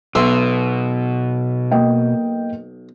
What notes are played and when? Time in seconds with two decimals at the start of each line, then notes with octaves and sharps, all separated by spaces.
0.15 B1 B2 E5 C6
1.71 A#3 D#5 G5